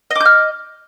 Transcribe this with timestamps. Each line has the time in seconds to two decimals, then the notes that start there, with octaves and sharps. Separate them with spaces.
0.10 D#5
0.15 D6
0.20 G6
0.25 F6